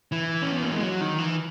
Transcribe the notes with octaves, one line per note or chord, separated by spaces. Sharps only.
E3
C#4
B3
A#3
G#3
F#3
D#3
E3